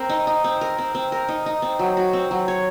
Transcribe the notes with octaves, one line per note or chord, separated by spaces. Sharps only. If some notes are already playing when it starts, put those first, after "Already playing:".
Already playing: C4 A#4
D#4
D#4
C4
A#4
C4
C4
A#4
D#4
D#4
C4
F#3
F#4
C4
F#3
C#5